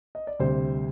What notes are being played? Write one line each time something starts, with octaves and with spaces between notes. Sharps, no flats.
D#5
D5
D2 C3 G3 C5